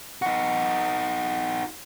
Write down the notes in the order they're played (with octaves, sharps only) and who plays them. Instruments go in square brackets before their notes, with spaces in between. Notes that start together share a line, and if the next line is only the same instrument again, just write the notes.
[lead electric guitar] D#4 F#4